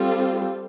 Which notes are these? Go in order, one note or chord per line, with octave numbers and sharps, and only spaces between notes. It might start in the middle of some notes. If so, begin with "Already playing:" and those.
Already playing: G3 C4 F4 A4